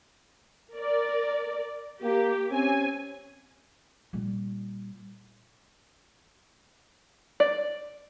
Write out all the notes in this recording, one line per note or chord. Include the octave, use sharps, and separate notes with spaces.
A#4 D5
A#3 G4
C4 C#4 G#5
A#2 G3
D5